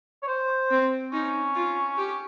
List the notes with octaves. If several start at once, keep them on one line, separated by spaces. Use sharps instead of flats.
C#5
C5
C4
C#4 D#4
F4
G4